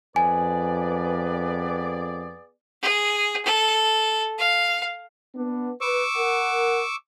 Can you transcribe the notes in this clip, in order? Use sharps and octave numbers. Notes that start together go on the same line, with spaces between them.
F2 B3 G#4 B4 D5 G#5
G#4
A4
F5
B3 D4
B4 C#6 D6 E6
A#4 F#5